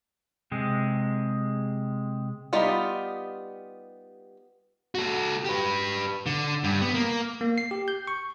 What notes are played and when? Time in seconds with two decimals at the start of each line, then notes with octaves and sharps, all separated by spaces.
0.52 C3 G#3
2.53 G3 B3 D#4 F4
4.95 F#4 A4
5.45 G4 B4
6.26 D3
6.64 G2
6.81 B3
6.94 A#3
7.41 A#3
7.58 C7
7.71 G4
7.88 G6
8.07 C#6